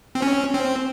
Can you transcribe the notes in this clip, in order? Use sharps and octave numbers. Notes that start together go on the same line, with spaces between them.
C4
C#4
C4